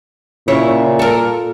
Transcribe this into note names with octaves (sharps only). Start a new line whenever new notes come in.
A#2 C#3 E4 C#5
A4 A#4